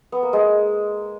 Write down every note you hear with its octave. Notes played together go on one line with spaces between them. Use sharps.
B3
A#3
G#3